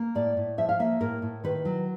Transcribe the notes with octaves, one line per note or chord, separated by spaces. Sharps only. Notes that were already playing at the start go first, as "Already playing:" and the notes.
Already playing: A#3
A2 D5
A2
F3 E5
F5
A#3 E5
A2 A#4
A2
D#3 B4
F#3